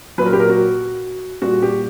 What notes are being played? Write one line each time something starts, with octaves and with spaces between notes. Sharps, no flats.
A#2 F#3 B4
A#4
G4
A#4
F#4
A#2 G3 F#4
G4